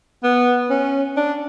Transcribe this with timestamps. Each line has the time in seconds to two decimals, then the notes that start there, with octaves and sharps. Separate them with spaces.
0.24 B3
0.70 C#4
1.17 D4